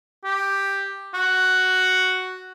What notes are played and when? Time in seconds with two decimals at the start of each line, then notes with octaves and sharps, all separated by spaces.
0.24 G4
1.14 F#4